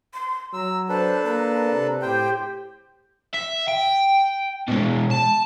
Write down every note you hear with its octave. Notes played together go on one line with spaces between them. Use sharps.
C6
F#3 A#5 E6
D4 A4 B4 C5
A#3 A#5
C3
A2 G4 C5 G5
E5
G5
B2 G#3
A5